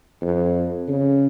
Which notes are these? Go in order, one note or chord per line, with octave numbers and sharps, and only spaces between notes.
F2
C#3